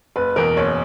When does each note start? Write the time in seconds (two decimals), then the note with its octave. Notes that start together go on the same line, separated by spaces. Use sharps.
0.16 F#1 B4
0.36 E2 B2 A#4
0.57 F#1 C#5